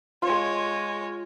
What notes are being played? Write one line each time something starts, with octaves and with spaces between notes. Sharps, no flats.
G#3 F4 C#5